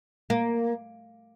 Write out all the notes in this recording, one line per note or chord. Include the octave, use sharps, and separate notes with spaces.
A#3